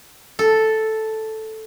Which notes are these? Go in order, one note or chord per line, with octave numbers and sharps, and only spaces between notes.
A4